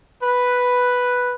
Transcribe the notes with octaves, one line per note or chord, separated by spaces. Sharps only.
B4